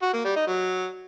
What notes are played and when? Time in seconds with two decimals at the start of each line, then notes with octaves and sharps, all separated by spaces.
0.02 F#4
0.13 A#3
0.25 G3
0.36 D#4
0.47 F#3